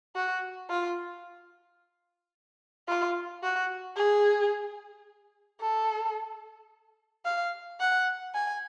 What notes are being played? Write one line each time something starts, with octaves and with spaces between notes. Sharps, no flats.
F#4
F4
F4
F#4
G#4
A4
F5
F#5
G#5